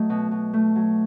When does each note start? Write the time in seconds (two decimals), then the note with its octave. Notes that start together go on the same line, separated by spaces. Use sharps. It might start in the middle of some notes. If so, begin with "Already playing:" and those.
Already playing: F#3 A3 D#5
0.10 B2
0.31 B2
0.54 A3
0.75 F#3